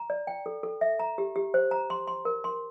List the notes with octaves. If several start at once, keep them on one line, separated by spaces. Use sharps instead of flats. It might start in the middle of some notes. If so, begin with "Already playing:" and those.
Already playing: A#5
D5
G5
A4
A4
E5
A#5
G4
G4
C5
A#5
C6
C6
A#4
C6